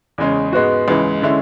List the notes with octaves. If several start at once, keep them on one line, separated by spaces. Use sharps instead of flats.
E2 C#3 G#3 C#4
G#2 G#3 B3 F#4
C#2 C#3 E3 G#3
D3 G#3 C#4 E4